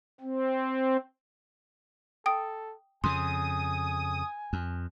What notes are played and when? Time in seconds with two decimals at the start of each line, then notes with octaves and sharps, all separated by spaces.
0.20 C4
2.26 A4 G5 D#6
3.04 F2 C#3 G#5 C6 D#6
4.53 F2